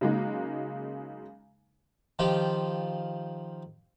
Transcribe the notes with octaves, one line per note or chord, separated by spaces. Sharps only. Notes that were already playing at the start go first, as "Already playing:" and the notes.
C#3 F#3 G#3 A#3 D#4
D#3 F3 F4 G4